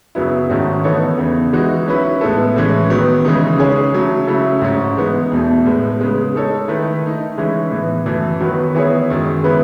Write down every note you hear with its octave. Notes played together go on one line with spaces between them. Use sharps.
F#2 C#3 F#3 B3 E4
G#2 D#3 A3 C#4 F#4
E3 B3 D#4 A4 C#5
E2 C#3 E3
E3 G#3 D#4 F#4
F#3 C#4 E4 B4
A2 G#3 B3 E4 A4
A2 E3 G#3 C#4
D#3 F#3 B3
C#3 E3 G#3 D#4
C#3 G#3 C#4 G#4 C#5
C#3 F#3 A3
C#3 F#3 A3 E4 A4
G#2 F#3 C#4
E3 G#3 B3 D#4
E2 B2 A3
A2 G#3 B3
C#3 G#3 B3
G#3 D#4 A4 C#5
D#3 A3 E4 B4
D#3 A3 D#4
E3 G#3 C#4 E4
A2 E3 B3
F#2 E3 A3
D#3 F#3 B3 F#4 B4
E3 B3 E4 G#4 C#5
F#2 D#3 G#3
C#3 G#3 B3 E4 B4